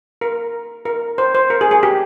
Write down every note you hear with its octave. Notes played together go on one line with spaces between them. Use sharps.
A#4
A#4
C5
C5
A#4
G#4
G#4
G4